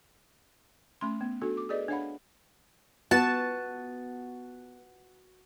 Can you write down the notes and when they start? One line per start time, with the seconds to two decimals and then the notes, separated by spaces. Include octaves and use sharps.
1.01 A3 C#4 B5 C6
1.21 B3
1.41 D4 F#4 A4
1.57 D6
1.69 G#4 A4 B4 D5 D#5
1.88 D4 C#5 F5 F#5 B5
3.11 B3 F#4 A5